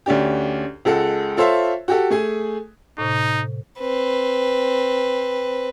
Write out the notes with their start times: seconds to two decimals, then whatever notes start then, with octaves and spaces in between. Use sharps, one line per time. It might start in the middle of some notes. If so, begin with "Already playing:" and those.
0.06 D2 C#4 D4 G4
0.85 C#2 G#3 A4 F#5
1.37 F4 A4 C5 C#5 E5
1.88 F#4 G4 A4
2.10 A3 G#4 G#5
2.98 A2 C3 D#4
3.80 C4 B4